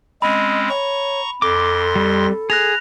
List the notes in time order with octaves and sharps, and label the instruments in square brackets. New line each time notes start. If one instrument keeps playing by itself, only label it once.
[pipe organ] G#3 C4 C#4 [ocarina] D#5 [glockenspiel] B5
[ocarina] C#5 [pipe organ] A#5 C#6
[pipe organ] F2 C6 A#6 [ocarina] A4 [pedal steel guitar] D6
[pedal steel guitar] G3
[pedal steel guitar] G#4 [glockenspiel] F#6 A#6 F7